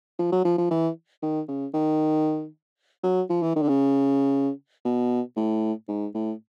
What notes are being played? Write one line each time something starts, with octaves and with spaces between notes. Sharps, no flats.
F3
F#3
F3
F3
E3
D#3
C#3
D#3
F#3
F3
E3
D#3
D3
C#3
B2
A2
G#2
A2